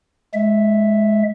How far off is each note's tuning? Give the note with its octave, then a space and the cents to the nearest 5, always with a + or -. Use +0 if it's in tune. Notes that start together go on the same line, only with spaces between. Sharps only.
G#3 +20 E5 +0